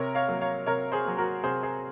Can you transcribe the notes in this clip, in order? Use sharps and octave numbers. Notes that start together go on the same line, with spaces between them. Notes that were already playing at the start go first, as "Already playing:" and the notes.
Already playing: C3 A#4 C#5
C#5 F5
F#3 A#3
C#5 F5
C3 A#4 C#5
G#4 C5
F#3 A#3
F#4 A#4
C3 G#4 C5
G#4 C5